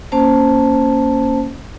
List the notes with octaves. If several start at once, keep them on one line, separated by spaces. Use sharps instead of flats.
A#3 C#4 C5 A5